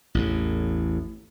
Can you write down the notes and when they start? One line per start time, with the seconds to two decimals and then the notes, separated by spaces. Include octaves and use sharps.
0.15 A1 E2 A2